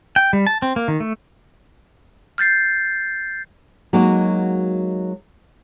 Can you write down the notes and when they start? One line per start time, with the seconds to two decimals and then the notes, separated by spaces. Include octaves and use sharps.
0.16 G5
0.33 G3
0.47 A5
0.62 C4
0.76 A#3
0.88 D#3
1.00 A3
2.38 F6 G6 A6 C7
3.93 F#3 G#3 A#3 D#4 F#4